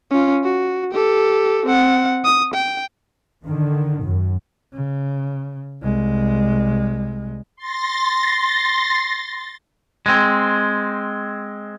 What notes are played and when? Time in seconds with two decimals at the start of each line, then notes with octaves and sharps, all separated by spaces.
0.11 C#4 F4
0.44 F#4
0.91 G4 A4
1.66 C4 F#5
2.25 D#6
2.54 G5
3.45 D3 D#3
4.02 F#2
4.73 C#3
5.82 C2 G#3
7.56 C6 A6 A#6
10.06 G#3 C4